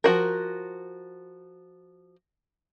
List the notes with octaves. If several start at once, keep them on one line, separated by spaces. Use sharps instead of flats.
F3 F#4 A#4